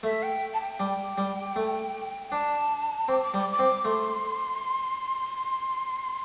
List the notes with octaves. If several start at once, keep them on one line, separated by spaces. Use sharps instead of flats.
A3 E5
G5
A5
G5
G3
G3
A3
G5
D4 A5
C4 D6
D6
G3
D6
D6
C4
A3 C6